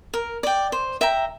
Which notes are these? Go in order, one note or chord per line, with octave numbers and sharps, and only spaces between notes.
A#4
D5 G5
C5
E5 G5 A#5